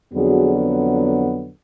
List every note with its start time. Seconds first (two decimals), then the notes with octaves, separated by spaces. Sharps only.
0.13 F2 D3 F#3 B3 F#4 G#4